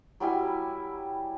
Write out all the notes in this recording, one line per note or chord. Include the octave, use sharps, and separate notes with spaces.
F#3 G3 E4 G#5